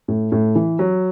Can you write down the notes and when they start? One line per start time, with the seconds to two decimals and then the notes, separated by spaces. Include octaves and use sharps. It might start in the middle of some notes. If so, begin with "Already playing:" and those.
0.08 A2
0.32 A2
0.55 E3
0.79 F#3